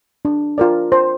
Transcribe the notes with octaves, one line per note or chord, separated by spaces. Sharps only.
D4
F4 A#4 D5
C5